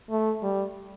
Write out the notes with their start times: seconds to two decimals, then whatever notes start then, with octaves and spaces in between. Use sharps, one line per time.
0.10 A3
0.43 G3